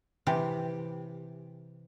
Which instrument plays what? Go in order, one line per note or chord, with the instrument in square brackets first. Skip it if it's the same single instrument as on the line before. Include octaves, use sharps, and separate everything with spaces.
[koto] C3 E3 G4